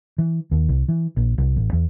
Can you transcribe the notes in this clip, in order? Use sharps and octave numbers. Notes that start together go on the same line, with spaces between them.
E3
D#2
C2
E3
A#1
C2
A1
E2